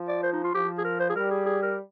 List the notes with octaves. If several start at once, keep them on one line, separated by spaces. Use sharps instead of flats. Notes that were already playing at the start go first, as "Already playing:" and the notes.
Already playing: F3
D5
C5
D#4
F4
F3 G4
G#4
A#4
C5
G#4
G3 A#4
G#4
G#4
A#4